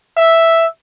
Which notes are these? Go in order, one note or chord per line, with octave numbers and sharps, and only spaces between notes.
E5